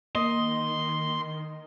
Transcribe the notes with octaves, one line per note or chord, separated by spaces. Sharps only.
D#3 A#3 D#5 C6